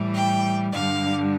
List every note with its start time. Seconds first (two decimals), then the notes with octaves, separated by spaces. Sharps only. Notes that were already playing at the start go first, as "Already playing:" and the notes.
Already playing: A2 E3 G3
0.13 G5
0.71 G2 D3 G3 F5